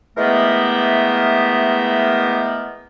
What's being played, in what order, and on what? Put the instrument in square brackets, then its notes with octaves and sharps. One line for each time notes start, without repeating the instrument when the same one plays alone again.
[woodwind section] E3 G#3 A3 B3 G4 A#4